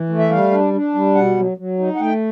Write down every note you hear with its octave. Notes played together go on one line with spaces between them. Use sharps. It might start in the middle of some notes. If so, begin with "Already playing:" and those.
Already playing: E3
A3
E5
G3 F5
D4
D4
G3
B2 F#5
F#3
F#3
D#4
F#5
A3 G5